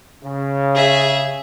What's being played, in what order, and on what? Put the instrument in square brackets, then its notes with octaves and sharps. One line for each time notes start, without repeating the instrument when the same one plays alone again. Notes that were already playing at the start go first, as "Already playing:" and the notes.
[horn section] C#3
[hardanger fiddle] G#4 E5